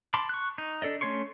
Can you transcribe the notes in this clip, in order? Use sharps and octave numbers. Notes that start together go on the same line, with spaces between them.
A5 B5 C6 D6
C#6 F#6
D#4
D4 A4 D5 D#5
A3 C#4 C#5 C6 C#6